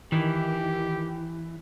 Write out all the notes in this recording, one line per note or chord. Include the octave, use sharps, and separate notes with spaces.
D#3 E3 G4